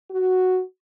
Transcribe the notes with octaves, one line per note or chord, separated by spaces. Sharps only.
F#4